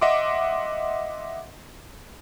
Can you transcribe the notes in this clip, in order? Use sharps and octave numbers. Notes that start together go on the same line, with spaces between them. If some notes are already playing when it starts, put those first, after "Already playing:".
D#5 E5 F#5 C6 D6